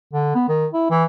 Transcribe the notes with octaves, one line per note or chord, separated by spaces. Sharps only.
D3
B3
D#3
E4
E3